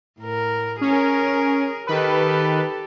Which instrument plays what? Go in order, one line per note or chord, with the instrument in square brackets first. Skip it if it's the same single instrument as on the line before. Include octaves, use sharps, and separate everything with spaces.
[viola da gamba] A2 A#4
[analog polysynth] C#4 [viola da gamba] G#4 A#4
[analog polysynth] D#3 B4 [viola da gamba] G4 A4